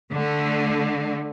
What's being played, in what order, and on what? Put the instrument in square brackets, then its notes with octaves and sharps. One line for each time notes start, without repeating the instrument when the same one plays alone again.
[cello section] D3 A3